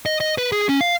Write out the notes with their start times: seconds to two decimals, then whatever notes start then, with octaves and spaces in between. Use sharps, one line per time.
0.06 D#5
0.20 D#5
0.38 B4
0.52 G#4
0.69 C#4
0.81 F5